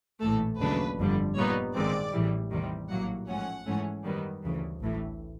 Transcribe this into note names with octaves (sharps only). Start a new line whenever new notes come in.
A#1 A2 E3 A3 A4
D#2 C#3 F#3 A3 D4 B4
G1 F2 D3 G3
A#2 G3 B3 D#4 C#5
A#1 G#2 D#3 G#3 C4 D5
A1 A2 E3 G3
E2 C3 D#3 G3
A#1 A2 F#3 A#3 F#5
G#2 F3 A3 C#4 F#5
G#2 E3 A3 C#4
F#2 D#3 G3 B3
D2 C#3 E3
A1 A2 E3